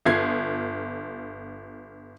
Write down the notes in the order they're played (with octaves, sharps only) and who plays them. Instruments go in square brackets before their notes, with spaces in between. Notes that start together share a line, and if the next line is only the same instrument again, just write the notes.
[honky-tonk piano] G1 F4 G#6 C7